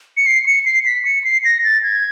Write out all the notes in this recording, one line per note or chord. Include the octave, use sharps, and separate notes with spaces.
C#7
C7
C#7
C7
B6
C#7
C7
A#6
A6
G#6